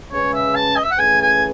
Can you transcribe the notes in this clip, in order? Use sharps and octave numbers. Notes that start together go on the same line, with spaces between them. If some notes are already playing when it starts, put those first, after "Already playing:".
C#3 G#3 C#4 G#4 B4 C#5
E5
A5
D#5
E5
F#5
E3 A3 C#4 G#4 B4 G#5
G#5